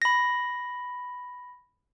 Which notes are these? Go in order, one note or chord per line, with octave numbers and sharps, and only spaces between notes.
B5 A#6